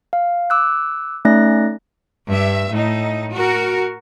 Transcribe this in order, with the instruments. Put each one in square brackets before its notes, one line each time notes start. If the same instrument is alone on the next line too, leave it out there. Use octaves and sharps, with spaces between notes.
[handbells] F5
D6 E6 F#6
A3 C#4 D#4 D5 F#6 A#6
[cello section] G2 E5
A2 D#4
F#4 A#4